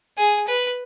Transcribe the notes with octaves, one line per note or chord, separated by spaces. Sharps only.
G#4
B4